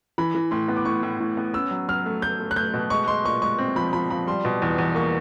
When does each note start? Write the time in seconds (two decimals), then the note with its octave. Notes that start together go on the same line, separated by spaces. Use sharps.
0.18 E3 B5
0.35 E3
0.51 A2 C6
0.68 B3
0.76 D6
0.85 A2 C#6
1.03 A2
1.21 A2
1.37 B3
1.53 C#4 E6
1.71 F#3
1.88 F#3 F6
2.06 A3
2.22 A3 G6
2.40 A3
2.51 F#6
2.56 A3 G6
2.74 B2
2.90 G#3 C#6
3.08 G#3 C6
3.25 A#2 C#6
3.42 G#3 C#6
3.58 C4
3.76 F3 B5
3.93 F3 B5
4.11 F3 B5
4.27 G3 C6
4.45 B2
4.62 E2
4.78 E2
4.95 A#3 C#6